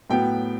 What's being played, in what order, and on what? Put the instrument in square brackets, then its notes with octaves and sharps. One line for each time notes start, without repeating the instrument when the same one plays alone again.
[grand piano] A2 F#3 B3 G5